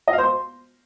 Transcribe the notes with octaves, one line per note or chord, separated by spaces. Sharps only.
D#5
F5
C5
C6